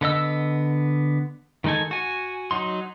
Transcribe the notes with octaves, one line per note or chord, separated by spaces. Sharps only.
D3 B3 D#5 E6
D#3 G#3 D#4 A4 G#5
F#4 G#5
F#3 D#4 C6